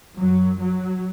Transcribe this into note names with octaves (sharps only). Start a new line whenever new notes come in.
F#2 F#3
F#3